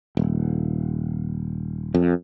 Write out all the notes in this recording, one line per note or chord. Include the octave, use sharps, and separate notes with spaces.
D#1
F2